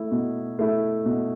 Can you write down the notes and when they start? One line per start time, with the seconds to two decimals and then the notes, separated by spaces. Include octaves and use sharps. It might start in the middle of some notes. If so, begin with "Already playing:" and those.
Already playing: A3 E4
0.11 B2
0.59 A3 E4
1.05 B2